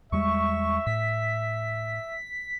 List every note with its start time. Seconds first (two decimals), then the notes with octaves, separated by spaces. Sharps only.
0.12 E2 G3 G#3 E5 C#6
0.86 A2 B6